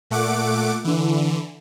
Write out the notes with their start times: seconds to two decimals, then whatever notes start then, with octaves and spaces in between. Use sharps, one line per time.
0.10 A#2 A3 F#5 D6 D7
0.85 D3 E3